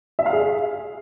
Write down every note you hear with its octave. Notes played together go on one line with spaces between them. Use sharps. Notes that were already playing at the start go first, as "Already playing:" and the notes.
E5
F5
G#4